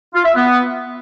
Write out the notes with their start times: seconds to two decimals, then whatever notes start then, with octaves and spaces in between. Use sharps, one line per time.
0.14 F4
0.25 E5
0.35 B3